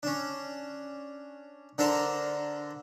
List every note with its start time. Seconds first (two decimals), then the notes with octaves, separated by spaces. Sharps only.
0.03 C#4 D4
1.78 D3 D4 A4 A#4 C5